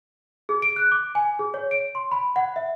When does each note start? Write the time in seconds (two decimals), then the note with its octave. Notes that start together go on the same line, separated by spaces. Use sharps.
0.49 G#4
0.62 D7
0.76 F#6
0.92 D6
1.15 G#5
1.39 G#4
1.54 C#5
1.71 D7
1.95 C6
2.11 B5
2.36 F#5
2.56 E5